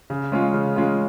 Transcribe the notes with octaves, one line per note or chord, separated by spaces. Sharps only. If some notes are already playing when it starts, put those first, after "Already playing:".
C#3
G#3 C#4 F4
C#3
G#3 C#4 F4